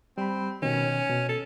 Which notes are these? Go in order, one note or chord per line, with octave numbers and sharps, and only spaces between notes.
G3 C4 B5
B2 D#3 C#4
B2
A4